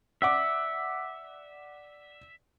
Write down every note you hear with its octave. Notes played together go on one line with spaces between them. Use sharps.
D5 E5 F#5 D6